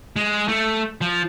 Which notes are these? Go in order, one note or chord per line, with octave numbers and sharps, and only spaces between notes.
G#3
A3
F3